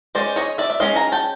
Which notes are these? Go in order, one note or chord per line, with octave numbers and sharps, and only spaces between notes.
G#3 C#4 C5 D5
C#5 D#5
D5 E5
E5
G#3 C#4 D#5 F5
G#5 A#5
G5 A5